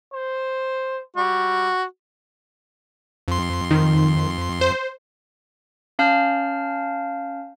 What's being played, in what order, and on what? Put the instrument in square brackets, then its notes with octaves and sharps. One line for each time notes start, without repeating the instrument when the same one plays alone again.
[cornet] C5
[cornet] G3 [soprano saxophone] F#4
[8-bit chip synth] F2 C6
[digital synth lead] D#3
C5
[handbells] C#4 F5 A5 F6 G6